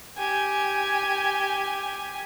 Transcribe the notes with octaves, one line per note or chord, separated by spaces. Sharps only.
G4 G#5